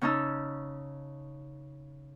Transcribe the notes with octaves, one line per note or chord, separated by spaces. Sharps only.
C#3 C#4 D#4 A5 E6